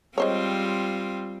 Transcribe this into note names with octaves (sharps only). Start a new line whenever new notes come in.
G3 G#3 C4 F4 C5 C#5